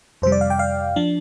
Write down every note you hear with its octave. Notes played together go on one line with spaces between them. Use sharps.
F2 C3 G3 C5
D5
F5
G5
F5
F3 D4